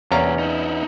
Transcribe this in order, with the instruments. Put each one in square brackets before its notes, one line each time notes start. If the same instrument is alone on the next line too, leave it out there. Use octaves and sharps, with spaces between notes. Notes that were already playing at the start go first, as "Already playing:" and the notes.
[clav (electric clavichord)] E2 C#4 D5 [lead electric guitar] C3 A#3 [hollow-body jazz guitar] C#5 F5 A#5
[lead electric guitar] D#4 E4